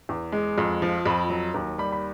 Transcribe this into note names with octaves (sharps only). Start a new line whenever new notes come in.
E2
G#3
F2
F3
F2 B5
F#3
D#2
G3 B5
B5